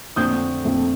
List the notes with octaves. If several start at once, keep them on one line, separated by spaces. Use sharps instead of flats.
F2 D3 A3 C4 D#6 G6
F2 D3 A3 C4